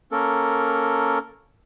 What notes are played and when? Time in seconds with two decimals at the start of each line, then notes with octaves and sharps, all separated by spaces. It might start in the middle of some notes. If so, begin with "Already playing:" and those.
0.12 A#3 C#4 A4 A#4